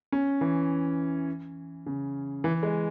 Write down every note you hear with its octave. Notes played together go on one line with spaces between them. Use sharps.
C#4
E3
C#3
E3
G#3